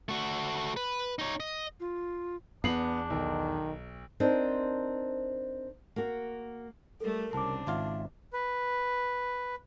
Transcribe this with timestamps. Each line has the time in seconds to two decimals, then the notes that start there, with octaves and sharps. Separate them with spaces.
0.09 A3 F#4
0.76 B4
1.19 D#4 C#5
1.40 D#5
1.80 F4
2.64 E2 B3 D4 C7 F#7
3.10 B1 D#3
4.20 C4 D4 D#4 A#4 C5
5.96 A#3 F#4
7.00 G3 A3 A4 A#4
7.33 C2 C#3 C4 D4 A5 D6
7.67 G#1 F4 E5 F5
8.33 B4